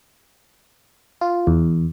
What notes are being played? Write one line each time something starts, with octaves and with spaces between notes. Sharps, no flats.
F4
E2